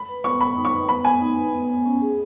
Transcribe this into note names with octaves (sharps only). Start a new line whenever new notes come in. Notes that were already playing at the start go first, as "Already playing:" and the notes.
Already playing: B5
B4
B3 C#6
B3 B5
D#4
C#6
B4
B3 B5
B3 G#5
D#4
B4
B3
B3
C#4
G#4